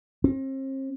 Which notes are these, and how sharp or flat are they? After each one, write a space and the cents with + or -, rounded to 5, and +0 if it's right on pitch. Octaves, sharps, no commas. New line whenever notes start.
C4 +40